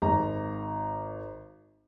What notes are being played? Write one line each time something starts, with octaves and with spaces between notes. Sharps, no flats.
G#1 A#5